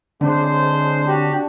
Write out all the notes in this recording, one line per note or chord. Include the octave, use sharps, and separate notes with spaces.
D3 G#3 C4 D4 C5
F#4 G4